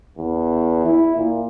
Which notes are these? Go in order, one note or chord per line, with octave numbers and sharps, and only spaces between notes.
E2
E4
A#2